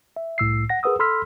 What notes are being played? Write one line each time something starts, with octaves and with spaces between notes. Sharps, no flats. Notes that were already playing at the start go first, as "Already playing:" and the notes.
E5
C2 A2 E6 C7
F#5 A#6
G#4 A#4 B4 F#5 D#6 E6
A4 B5 C6 E6 F6 B6